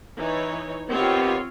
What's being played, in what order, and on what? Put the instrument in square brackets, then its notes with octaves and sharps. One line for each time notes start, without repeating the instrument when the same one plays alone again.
[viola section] E3 D#4 C#5
[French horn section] D#3 B3 G4 [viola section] C4 F4 C#5